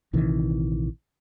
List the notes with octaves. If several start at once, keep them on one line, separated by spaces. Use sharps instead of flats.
A#1 C3 D#3 E3